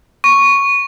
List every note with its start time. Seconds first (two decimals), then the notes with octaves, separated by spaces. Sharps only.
0.24 C#6